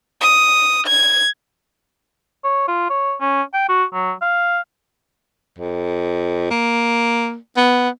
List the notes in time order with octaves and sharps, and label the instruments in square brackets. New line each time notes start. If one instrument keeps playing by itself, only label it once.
[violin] D#6
G#6
[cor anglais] C#5
F4
C#5
C#4
G5
F#4
F#3
F5
[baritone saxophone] F2
A#3
B3